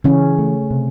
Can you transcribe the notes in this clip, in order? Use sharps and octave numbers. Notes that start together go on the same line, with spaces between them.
C#3 E3 C#4
A3
C3